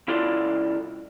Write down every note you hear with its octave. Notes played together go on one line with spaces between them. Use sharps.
C#2 E4 F4 A4 D5 C6